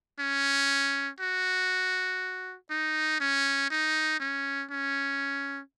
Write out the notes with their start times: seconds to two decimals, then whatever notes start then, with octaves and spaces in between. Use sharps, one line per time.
0.19 C#4
1.20 F#4
2.70 D#4
3.20 C#4
3.70 D#4
4.20 C#4
4.70 C#4